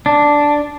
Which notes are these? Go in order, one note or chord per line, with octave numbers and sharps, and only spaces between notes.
D4